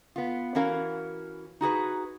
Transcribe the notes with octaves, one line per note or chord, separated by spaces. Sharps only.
B3 F4
E3 C#4 F#4 A#4 F5
D#4 F#4 G#4 B4